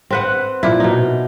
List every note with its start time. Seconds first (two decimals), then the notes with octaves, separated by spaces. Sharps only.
0.10 C4 B4 F#5
0.63 A#2 E4
0.80 B2 D#4